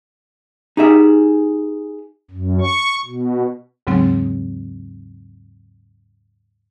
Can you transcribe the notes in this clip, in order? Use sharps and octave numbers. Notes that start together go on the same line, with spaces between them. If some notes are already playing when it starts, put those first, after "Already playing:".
D#4 G4 G#4 E5
F#2
C#6
B2
D#2 G#2 C#3 F#3 G#3 C4